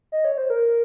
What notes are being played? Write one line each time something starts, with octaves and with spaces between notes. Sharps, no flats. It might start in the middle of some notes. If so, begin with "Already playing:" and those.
D#5
C#5
C5
A#4